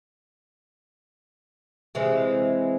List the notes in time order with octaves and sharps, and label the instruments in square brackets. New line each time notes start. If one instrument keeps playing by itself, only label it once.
[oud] C3 E3 G#3